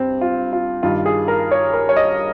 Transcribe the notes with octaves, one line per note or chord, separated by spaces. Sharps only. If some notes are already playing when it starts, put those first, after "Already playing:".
Already playing: G2 C4
F4
F4
G2 D#3 F4
G#4
A#4
C#5
A#4
C#5
D#5